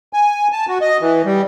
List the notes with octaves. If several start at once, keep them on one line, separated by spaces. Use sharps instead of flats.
G#5
A5
F#4
D#5
E3
G3